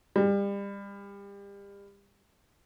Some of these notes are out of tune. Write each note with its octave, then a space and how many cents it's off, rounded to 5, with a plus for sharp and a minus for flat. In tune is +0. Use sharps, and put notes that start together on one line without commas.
G3 +30